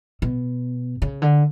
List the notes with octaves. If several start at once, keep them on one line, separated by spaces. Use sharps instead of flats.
B2
C#3
D3